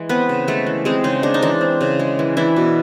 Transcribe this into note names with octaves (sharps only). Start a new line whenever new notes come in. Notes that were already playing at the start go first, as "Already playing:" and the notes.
Already playing: E3 G#3
B3 C4 B4
C#3
G#3 A3 A4
E3
G#3 C4 G#4
C#3 D#4
G#3 D4
D#4
E3 D4
C4
C#3
G#3
E3
E3 D4 E4
B2